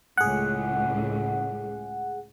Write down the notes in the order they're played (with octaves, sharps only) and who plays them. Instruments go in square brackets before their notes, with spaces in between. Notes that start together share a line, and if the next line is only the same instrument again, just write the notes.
[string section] C#2 A2 [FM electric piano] G#4 F#5